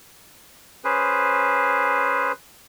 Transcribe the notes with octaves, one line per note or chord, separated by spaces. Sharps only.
C#4 G#4 B4 C5